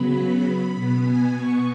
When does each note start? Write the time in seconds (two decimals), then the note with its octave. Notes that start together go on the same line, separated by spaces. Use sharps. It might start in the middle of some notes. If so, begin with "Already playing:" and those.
Already playing: C#3 F#3 B3 B5
0.74 B2 B3 B5
1.03 G#5
1.33 C#6